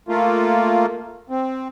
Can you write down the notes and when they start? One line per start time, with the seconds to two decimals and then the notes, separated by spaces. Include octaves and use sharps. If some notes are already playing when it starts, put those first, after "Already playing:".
0.08 A3 A#3 F4
1.30 C4